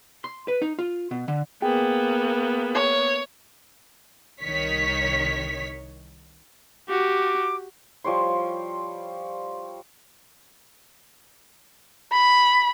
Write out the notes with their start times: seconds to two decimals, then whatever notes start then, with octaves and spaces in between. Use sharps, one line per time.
0.24 C6
0.48 B4
0.62 D#4
0.79 F4
1.11 B2
1.28 D3
1.62 A#3 B3 G#4 G5
2.74 C#5
4.41 C2 D#3 C#5 B6
6.89 F#4 G4 D6
8.04 F3 G3 C#5 C6
12.12 B5